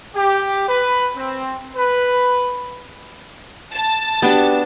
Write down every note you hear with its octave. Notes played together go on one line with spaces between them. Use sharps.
G4
B4
C4
B4
A5
B3 D4 F#4 G4